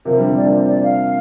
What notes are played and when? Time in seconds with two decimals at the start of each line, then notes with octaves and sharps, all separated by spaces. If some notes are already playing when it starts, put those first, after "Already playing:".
0.05 C3 F3 A#4
0.17 D3 G3
0.29 G3 C4
0.37 A#3 D4 D5
0.52 C4 F4
0.68 D5
0.83 F5